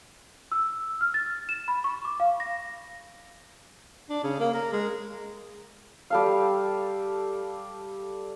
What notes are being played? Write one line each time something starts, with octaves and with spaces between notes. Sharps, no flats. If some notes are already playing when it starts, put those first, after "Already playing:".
E6
F6
A6
E7
B5
C#6
D6
F5
A#6
D4
C#3
A#3
A#4
G#3
G3 A4 F5